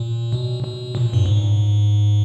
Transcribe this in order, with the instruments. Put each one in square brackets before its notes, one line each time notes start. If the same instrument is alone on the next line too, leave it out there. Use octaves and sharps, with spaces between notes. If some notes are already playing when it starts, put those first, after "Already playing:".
Already playing: [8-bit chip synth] A#2
B2
B2
A#2
G2
G#2